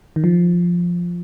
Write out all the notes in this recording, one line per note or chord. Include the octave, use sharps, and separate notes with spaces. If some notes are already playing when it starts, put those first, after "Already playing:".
D#3
F3